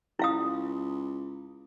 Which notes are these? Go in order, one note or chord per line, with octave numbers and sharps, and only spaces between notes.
C#2 E4 F5 D#6